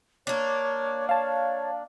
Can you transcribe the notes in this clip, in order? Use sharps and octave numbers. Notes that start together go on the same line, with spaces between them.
A#3 D4 C#5
C#5 F5 A5